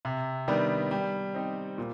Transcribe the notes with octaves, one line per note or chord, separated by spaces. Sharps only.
C3
D#3 G3 B3 D4
G3
C4 D#4 G4
A#2